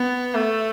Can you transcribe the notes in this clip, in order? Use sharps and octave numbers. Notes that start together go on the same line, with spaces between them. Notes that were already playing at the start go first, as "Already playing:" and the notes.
Already playing: B3
A3